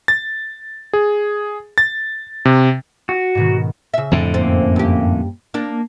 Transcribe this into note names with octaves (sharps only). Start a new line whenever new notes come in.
A6
G#4
A6
C3
F#4
G#2 B2 D#3
C#3 E5
F2 A2 D3
F#2 A#3 C4
G2 G4
A#3 D4